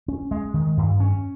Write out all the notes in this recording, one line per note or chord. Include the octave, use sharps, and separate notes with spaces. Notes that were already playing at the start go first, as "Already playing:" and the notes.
C#4
G#3
D#3
G2
C#4